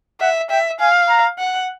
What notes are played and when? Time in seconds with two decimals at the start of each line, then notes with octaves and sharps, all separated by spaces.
0.21 E5 F#5
0.50 E5 G5
0.80 F5 G#5
1.09 A#5
1.39 F#5